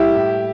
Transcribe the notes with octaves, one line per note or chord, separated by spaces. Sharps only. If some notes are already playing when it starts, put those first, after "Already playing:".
Already playing: A2 G3 E4 G4
A2